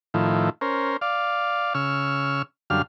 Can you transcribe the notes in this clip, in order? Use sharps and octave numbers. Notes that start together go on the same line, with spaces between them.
A2 D#3 F3 E4
C#4 A#4 C5
D5 F5
C#3 C#6 E6 F6
F#2 D3 G3 F5 F6